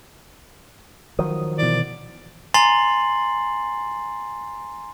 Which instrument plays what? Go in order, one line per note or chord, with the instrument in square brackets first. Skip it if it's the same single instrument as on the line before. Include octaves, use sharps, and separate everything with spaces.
[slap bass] D#3 F3 F#3 [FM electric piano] D#6
[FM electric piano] B2 E3 [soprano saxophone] D5
[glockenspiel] G#5 A#5 C6 A6 C7 F#7